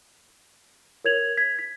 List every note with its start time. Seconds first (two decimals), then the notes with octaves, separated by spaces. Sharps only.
1.04 A#4 C#5 G#6 F7 F#7
1.37 G#6 B6
1.59 B6